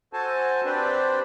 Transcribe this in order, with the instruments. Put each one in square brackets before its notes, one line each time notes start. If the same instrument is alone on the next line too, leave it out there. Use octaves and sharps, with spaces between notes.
[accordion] F#4 A4 C5 G#5 A5
C4 D4 G4 B4 C5 D5